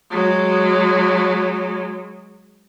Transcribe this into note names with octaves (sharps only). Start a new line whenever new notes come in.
F#3 G#3